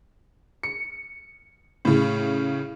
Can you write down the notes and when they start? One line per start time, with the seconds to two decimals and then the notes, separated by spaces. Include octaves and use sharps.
0.63 C#7
1.85 A2 C#3